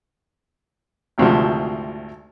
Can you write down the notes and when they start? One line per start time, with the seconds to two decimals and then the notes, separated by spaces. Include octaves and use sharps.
1.18 G#1 D2 C3 F3